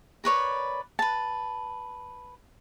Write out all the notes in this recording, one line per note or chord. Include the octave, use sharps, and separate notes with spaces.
A#4 B4 C#5 D5
B4 A5